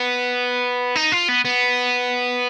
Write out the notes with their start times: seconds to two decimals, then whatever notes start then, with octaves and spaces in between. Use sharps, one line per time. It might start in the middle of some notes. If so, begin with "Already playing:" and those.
Already playing: B3
0.95 D#4
1.12 F4
1.28 B3
1.45 B3